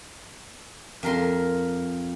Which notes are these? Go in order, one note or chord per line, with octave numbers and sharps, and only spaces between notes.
F2 A#4 C6